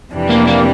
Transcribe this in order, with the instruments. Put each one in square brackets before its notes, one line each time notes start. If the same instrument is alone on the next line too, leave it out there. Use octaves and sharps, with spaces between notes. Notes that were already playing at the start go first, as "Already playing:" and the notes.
[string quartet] F2 C3 E3 G3 D4
[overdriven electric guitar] A#3
A#3